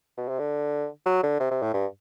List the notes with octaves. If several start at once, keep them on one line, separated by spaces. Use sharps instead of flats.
B2
C3
D3
F#3
D3
C3
C3
A2
G2